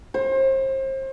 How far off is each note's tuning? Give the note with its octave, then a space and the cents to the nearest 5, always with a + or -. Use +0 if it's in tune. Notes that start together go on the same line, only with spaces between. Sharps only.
C5 +35